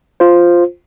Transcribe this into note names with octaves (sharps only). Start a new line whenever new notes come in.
F4 C5